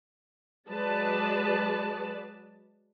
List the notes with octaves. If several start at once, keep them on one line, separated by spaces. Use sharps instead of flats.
F#3 G#3 G#4 B4 D5 A5